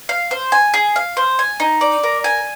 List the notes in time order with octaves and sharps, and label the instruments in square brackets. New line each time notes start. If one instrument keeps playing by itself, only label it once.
[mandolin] F5
C5
G#5
G#4
F5
C5
G#5
D#4
D5
A#4
G#5